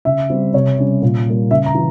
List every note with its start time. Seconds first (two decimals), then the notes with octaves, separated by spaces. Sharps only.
0.05 C#3 E5
0.30 G3 C4
0.53 C3 C#5
0.78 G3 C#4
1.02 A#2
1.26 G3 A#3
1.51 C#3 E5
1.66 A#5
1.75 E3